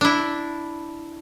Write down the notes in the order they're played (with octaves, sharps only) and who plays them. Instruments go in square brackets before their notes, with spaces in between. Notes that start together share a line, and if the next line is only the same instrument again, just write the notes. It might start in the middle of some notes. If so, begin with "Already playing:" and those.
[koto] D4 E4